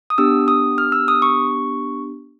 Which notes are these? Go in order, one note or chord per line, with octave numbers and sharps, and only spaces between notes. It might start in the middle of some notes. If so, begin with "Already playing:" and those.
D#6
B3 D4 G4 E6
D#6
F6
E6
D#6
C#6